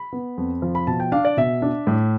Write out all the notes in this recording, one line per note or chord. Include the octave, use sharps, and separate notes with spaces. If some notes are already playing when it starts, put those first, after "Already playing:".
Already playing: B5
B3
F2
F3
B5
B2 A5
G5
D4 F5
D5
B2 E5
D4
A2